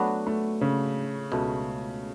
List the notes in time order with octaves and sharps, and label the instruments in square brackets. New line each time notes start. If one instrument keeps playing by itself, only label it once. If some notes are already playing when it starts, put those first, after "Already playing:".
Already playing: [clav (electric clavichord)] F#3 B3 D4 F#4 B4 [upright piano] A3
[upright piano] A3
C#3
[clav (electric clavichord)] C#2 B2 A3